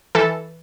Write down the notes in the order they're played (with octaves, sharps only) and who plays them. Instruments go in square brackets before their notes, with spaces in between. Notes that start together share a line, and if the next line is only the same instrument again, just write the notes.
[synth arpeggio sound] E3 A4